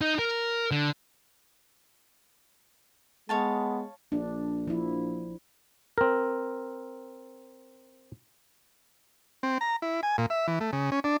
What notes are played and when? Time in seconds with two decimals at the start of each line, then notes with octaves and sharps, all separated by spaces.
0.01 D#4
0.19 A#4
0.71 D3
3.29 G#3 B3 C#5 F5 A5
4.12 A#1 D4
4.67 F3 E4
5.98 C4 A#4
9.43 C4
9.61 A#5
9.82 E4
10.03 G#5
10.18 A#2
10.30 E5
10.47 E3
10.60 A3
10.73 C#3
10.92 C#4
11.04 D4